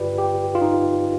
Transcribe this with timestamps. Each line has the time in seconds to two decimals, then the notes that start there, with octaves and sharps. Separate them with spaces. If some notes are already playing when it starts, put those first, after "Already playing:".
Already playing: G1 G2 D3 F4 G4 B4 D5
0.18 G4
0.55 F4
0.61 D#4